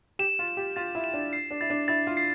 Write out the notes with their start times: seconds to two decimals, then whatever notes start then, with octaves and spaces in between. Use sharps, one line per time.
0.19 G4 E7
0.39 F4
0.48 E7
0.57 G4
0.76 F4 A6
0.95 E4
1.04 E7
1.14 D4
1.33 C7
1.51 D4
1.61 E4 A6
1.70 D4
1.88 E4 A6
2.07 F4
2.17 C7